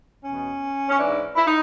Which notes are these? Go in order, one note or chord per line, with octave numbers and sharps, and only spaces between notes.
E2 B2 C#4
C#4
G#2 E3 D4
E4
D#4